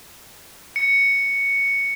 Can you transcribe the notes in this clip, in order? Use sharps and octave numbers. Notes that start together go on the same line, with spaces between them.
C#7